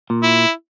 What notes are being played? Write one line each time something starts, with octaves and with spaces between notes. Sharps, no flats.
A#2
E4